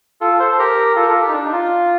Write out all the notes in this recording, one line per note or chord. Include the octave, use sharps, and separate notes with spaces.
F4 A4
A4 C5
C5
G4 A#4
F4 A4
A#4
F4 A4
G4
D#4
D4
D#4
F4